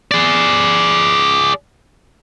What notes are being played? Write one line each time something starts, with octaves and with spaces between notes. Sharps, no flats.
G#4 D5